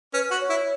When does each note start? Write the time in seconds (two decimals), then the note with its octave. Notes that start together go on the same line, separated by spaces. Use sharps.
0.13 C#4 B4
0.31 F#4
0.41 C#5
0.50 E4